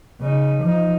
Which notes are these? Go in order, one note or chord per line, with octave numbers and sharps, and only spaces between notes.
C#3 D#4
F3 D#4